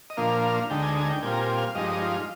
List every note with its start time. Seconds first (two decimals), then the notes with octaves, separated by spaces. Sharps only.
0.10 D#5
0.17 A#2 F3 A#3 D4 F5
0.70 D2 D3 G#3 D#4 G5
0.83 G#5
0.96 G#5
1.10 G5
1.23 A#2 G3 C4 F4 G#5
1.32 A#5
1.40 G#5
1.58 F5
1.75 G2 F3 G#3 D#4 D#5
2.02 F4